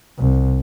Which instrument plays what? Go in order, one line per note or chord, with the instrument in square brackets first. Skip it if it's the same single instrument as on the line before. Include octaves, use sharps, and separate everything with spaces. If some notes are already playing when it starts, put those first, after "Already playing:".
[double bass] C2